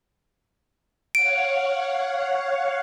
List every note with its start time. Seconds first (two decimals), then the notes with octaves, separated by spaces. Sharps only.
1.15 C#5 F5 F#5 D7